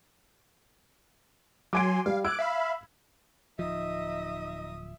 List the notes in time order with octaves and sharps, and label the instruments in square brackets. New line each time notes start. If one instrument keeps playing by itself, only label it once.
[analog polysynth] F#3 G#5 C6 [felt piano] D6 G#6 D7
[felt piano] G3 [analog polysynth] F5
[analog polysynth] D6 F#6 D7 [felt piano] E6 G#6
[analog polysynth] E5 F5 B5
[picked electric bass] D1 F3 [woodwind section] D#4 D#5 [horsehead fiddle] E5 [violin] D#6